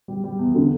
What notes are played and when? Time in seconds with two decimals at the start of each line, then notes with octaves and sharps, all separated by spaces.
0.08 G3
0.24 G3
0.39 E2
0.55 D3